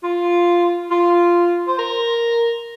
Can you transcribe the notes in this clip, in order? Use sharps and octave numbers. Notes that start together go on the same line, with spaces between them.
F4
F4
C5
A#4